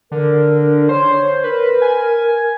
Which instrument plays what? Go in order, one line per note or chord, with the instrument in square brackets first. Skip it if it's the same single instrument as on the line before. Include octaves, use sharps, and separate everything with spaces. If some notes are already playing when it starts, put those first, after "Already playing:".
[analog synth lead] D3 [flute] A#4
[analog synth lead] C5 [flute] C#5
[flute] A#4 [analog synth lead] B4
[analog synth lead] G#5